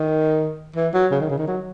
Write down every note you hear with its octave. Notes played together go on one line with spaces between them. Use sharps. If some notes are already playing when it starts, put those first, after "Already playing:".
Already playing: D#3
E3
F#3
C#3
D#3
C#3
D#3
F#3